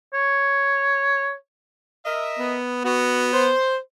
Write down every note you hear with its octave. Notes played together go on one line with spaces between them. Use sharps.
C#5
A#4 D#5 E5
B3
B3 F#4
C5